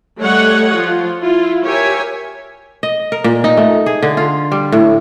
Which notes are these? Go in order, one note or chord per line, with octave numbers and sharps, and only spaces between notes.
G3 A3 C#5 D#5 F#5
F3 F4
E4 F4
G4 A#4 C#5 E5 G#5
D#5
A#4
A#2
D#4
A3
G#4
D3
F4
G3
A2